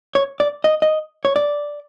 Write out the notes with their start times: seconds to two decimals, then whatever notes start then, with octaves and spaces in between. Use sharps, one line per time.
0.15 C#5
0.40 D5
0.64 D#5
0.82 D#5
1.25 C#5
1.36 D5